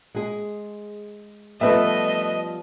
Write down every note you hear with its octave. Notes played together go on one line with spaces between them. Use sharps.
G#3 G#4
F3 G3 A3 B3 B4 D#5 E5